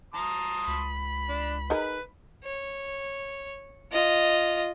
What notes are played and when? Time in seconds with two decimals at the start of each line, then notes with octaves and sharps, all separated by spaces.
0.14 A5 A#5 C6 D#6
0.68 C#2 B5
1.29 D4
1.70 D#4 G#4 A#4 B4
2.44 C#5
3.92 F4 D#5